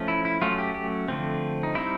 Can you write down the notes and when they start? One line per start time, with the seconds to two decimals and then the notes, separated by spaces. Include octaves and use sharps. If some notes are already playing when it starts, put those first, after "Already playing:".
Already playing: F3 A3 C#4
0.08 E4
0.25 E4
0.42 F#3 A3 C#4 F4
0.58 G4
0.75 G4
1.08 D3 F3 A3 C4
1.63 D#4
1.75 G3 C4 D#4 E4